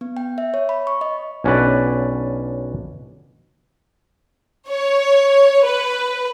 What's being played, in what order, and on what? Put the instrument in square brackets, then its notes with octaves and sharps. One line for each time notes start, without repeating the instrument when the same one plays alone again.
[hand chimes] B3
G5
E5
C#5
B5
C#6
D#5
[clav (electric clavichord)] B1 C#4 D4 F#4 B4 D5
[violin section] C#5
B4